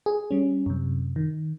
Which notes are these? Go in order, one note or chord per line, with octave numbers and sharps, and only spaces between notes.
G#4
G3 C#4
F#2 C3
D#3